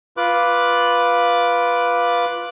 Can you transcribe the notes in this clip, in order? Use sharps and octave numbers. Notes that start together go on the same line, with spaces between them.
F4 B4 D6 F#6